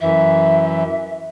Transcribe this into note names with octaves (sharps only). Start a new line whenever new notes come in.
F#2 E3 E5